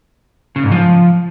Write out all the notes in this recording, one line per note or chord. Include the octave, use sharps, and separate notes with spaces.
C#3
G#2
F3